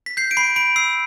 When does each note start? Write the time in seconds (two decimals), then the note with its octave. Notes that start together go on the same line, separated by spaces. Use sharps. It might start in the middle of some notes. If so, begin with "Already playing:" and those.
0.06 B6
0.17 G6 C7
0.31 D7
0.37 B5 C7
0.56 B5 D7
0.76 E6 C7